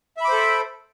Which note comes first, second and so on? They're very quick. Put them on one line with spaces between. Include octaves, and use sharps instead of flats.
E5 B5 D6 C5 A4